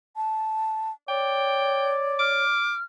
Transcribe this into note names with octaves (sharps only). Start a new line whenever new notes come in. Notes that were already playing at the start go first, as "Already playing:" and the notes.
A5
C#5 D5 G5
D6 F6